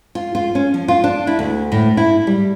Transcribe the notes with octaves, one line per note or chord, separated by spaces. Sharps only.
F4
F4
C#4
F3
F4
D4
E4
D2
A2
E4
G3